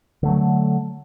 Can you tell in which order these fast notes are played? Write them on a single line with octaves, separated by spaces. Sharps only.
D3 A3 F#3